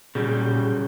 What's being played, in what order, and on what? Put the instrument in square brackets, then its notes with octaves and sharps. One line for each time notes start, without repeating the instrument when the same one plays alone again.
[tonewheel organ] A#2 G#4 G6 [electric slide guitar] C#3 F#3 G3